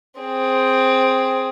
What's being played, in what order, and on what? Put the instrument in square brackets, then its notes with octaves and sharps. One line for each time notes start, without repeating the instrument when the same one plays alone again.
[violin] C4 G#4